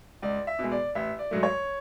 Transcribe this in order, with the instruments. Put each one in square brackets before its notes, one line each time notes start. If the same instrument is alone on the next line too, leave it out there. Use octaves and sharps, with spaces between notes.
[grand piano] C#2 D5
E5
B2 G#3
D5
A1 E5
D5
G#2 F#3 A3
C#5